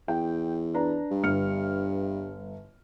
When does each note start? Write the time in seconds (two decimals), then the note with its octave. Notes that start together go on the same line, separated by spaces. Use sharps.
0.08 E2 G5
0.74 D4 B4 A#5
1.11 G2
1.23 G1 F6 C#7